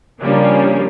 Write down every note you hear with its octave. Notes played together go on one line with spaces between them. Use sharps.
C#3 F3 G3 A#3 C#4 D4